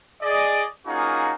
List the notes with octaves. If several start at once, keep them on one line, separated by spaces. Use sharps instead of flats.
G#4 D5 D#5
A#3 C#4 D#4 F4 F#4 G#4